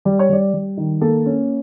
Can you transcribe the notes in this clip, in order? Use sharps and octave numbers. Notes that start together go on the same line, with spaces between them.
G3 D5
C#5
G3 D5
G3
D#3
A#3 A4
C#4